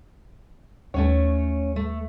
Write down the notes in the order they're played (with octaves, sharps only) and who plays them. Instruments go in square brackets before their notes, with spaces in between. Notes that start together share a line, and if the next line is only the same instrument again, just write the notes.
[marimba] D#2 [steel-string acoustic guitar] A3 C#4 C#5
[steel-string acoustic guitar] A3